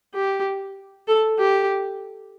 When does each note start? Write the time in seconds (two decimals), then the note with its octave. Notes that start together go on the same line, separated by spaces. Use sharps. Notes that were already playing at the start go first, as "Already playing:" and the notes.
0.14 G4
1.07 A4
1.38 G4